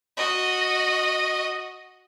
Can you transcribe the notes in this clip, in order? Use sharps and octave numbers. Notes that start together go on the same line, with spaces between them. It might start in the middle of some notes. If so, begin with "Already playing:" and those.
F#4 D#5